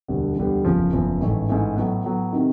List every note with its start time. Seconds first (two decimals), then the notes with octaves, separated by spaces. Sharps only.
0.08 E1 D2 D3 G3 B3
0.37 E1 D2 D3 G3 B3
0.65 F#1 E2 C#3 F3
0.93 F#1 E2 C#3 F3
1.20 A1 G#2 E3 A3
1.49 A1 G#2 E3 A3
1.76 A2 F#3 B3
2.04 A2 F#3 B3
2.33 C3 D#3